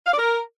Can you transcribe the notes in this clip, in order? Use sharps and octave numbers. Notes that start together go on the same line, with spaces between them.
F5
D5
A#4